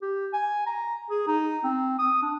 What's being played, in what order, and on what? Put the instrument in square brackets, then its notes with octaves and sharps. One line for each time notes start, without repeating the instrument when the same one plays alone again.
[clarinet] G4
G#5
A#5
G#4
D#4
C4
D#6
D4